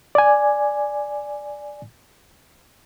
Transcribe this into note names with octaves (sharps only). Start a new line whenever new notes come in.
D5 G#5